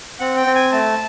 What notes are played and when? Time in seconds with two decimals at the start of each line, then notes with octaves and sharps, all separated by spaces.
0.20 C4 F#5
0.37 G5
0.46 C4
0.55 G#5
0.72 A3 A5